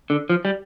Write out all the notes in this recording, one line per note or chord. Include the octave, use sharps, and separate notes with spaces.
D3
F3
G3